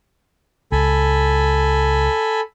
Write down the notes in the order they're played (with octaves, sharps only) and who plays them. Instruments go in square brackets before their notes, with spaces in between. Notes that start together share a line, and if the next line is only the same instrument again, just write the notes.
[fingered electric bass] C#2 [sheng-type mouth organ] A4 G#5 B5